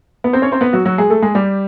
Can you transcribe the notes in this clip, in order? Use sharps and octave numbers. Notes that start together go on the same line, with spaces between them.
B3 B4
C4 C5
C#4 C#5
C4 C5
B3 B4
F#3 F#4
F#3 F#4
G#3 G#4
A3 A4
G#3 G#4
G3 G4